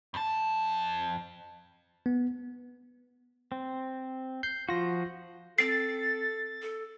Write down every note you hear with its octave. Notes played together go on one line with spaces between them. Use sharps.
F2 A5
B3
C4
G6 C7
F3 F4 F#4 A#6
C4 A4 A6 C7
A4